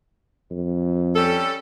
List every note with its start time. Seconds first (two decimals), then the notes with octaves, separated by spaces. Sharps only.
0.51 F2
1.16 G3 C#4 A4